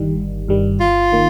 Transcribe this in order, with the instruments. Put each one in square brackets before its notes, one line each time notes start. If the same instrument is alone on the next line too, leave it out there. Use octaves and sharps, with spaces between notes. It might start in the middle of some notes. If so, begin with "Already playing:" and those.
Already playing: [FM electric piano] G1 G2 D#3 G3
G1
G2 D#3 G3
[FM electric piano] G1 [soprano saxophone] F4
[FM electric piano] D#3 A#3